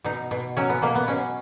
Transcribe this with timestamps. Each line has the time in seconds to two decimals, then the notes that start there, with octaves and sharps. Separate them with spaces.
0.04 B2 D#4
0.31 B2
0.57 F#3 C#4
0.69 B3
0.82 B2 A#3
0.95 B3
1.08 B2 C#4